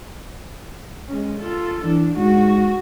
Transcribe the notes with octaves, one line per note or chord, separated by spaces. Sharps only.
G#3 C#4
F4 A4
E3 D4
G#2 F#4